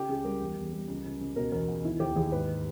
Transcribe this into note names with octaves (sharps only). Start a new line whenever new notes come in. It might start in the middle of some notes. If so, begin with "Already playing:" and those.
Already playing: C#3 G4
C#2 G#4
G3 A#4
E2
E2
G3
C#2
C#2
C#2
B2 A#4
E2 A#4
E2
D#3 E4
D#2 G4
D#2 G#4
G#2 B4